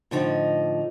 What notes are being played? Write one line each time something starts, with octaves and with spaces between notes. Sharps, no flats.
A2 D3 F3 D#4